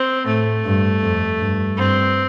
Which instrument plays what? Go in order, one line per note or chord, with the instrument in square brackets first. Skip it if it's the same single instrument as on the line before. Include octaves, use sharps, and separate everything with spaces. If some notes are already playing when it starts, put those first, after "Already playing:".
Already playing: [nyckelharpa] C4
[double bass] A2 [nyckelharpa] A3
[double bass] G2
F2
G2
[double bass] G2 [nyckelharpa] C4